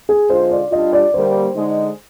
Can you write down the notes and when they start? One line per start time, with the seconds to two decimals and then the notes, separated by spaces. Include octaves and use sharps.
0.09 G#4
0.30 D3 G#3 D4 F4 C5
0.51 D5
0.72 G3 D4 F4 D#5
0.93 D5
1.14 D3 G3 A#3 C5
1.56 D3 G#3 D#4